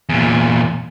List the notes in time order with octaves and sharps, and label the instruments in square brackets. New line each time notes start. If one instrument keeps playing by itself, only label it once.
[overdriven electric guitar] E2 A#2